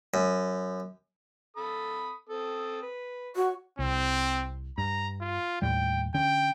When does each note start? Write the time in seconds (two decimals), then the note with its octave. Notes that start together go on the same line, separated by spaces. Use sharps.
0.14 F#2
1.57 A4 B5 D#6
2.29 C4 A4 D#6
2.82 B4
3.36 F#4 C#5
3.79 C2 C4
4.78 G2 A#5
5.21 F4
5.62 D#2 A2 G3 G5
6.14 D3 C#4 G5